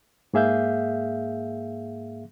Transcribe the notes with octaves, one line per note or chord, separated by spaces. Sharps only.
G#2 A#3 G#4 E5 F5 G6